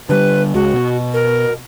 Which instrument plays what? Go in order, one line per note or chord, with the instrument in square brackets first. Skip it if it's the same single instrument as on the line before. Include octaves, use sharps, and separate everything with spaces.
[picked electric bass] D3 G3 [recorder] B4
[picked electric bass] C#2 G#3 [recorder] F#4
[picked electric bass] B2
[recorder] A#4